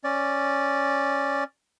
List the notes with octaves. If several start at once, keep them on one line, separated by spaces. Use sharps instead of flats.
C#4 D5